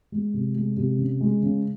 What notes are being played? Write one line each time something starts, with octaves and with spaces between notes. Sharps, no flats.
G#3
C3
G#3
C3
C#3
G#3
C#3